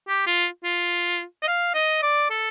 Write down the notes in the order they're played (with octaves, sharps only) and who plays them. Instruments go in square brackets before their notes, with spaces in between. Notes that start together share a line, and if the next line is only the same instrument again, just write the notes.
[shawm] G4
F4
F4
D#5
F5
D#5
D5
A4